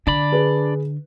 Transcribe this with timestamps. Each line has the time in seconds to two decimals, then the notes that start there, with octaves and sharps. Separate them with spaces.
0.07 D3 D4 D5 B5
0.32 G#4 B4